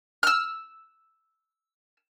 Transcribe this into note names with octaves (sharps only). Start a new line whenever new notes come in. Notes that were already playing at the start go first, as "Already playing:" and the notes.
E6 F6